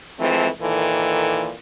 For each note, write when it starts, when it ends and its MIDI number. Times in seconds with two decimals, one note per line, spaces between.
0.18 0.48 52
0.18 0.48 53
0.18 0.48 56
0.18 0.48 57
0.18 0.48 60
0.61 1.52 46
0.61 1.52 51
0.61 1.52 52
0.61 1.52 69